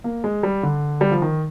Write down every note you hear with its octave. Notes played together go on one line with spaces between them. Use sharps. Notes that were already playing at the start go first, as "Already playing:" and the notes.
A#3
G#3
G3
D3
G3
F3
D#3